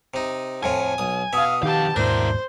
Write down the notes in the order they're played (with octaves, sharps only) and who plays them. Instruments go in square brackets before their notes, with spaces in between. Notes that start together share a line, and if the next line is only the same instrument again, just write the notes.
[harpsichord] C3 D#4
[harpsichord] F2 A2 F4 [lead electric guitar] G#5
[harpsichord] B1 D#6
[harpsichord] B2 E5 [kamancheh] F5 D#6
[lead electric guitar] F2 F5 [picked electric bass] D#3 [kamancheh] G4 A5
[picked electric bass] D#2 G#2 B2 [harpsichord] D4 [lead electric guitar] E4 A#4 [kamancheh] C5